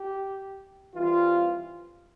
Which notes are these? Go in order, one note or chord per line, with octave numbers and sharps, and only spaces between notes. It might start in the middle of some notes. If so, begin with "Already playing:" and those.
Already playing: G4
E3 G3 C4 F4